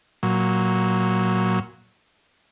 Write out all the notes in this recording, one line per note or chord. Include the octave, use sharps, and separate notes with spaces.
A#2 F#3